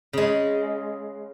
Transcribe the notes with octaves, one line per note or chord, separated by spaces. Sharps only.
C#3 G#3